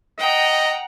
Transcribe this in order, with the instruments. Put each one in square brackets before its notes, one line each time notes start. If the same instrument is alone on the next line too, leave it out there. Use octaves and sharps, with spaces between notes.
[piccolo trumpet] D#5 [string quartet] F#5 G5 A#5